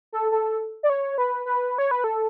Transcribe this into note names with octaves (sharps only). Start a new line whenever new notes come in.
A4
A4
D5
C#5
B4
B4
C#5
B4
A4